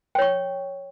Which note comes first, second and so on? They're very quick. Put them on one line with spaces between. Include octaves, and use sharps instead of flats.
G5 C#5 C#6